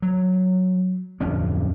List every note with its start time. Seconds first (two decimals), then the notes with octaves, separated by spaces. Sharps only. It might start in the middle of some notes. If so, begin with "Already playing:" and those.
0.02 F#3
1.20 D1 F2 C#4 D4